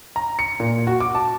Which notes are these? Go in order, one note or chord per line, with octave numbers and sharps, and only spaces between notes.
A#5
C#7
A#2
F#4
D6
A5